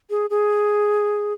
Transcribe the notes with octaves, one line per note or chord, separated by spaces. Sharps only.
G#4
G#4